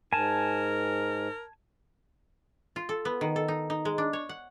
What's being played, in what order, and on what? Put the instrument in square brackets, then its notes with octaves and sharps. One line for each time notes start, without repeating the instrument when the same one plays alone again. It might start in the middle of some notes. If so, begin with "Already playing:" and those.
[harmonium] G#2 [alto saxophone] A#4 [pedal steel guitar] G#5 A5
[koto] F4
A4
B3
D#3
A4
D#4
D#4
G#3
D4
C#5
F#5